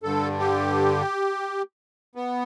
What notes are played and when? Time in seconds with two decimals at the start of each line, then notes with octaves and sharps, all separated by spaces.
0.03 G2 D3 A4
0.39 G4
2.15 B3